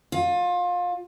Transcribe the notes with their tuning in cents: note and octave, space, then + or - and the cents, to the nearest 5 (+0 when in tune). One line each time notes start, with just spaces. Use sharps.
F4 +25